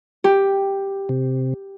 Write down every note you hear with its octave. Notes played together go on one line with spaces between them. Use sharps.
G4
C3